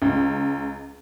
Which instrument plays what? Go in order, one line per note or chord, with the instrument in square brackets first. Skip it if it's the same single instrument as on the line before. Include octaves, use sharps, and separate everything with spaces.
[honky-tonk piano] C#2